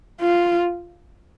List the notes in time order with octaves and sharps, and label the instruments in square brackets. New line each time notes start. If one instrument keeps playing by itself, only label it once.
[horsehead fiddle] F4